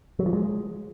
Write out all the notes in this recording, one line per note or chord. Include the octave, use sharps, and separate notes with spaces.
F#3
F3
G#3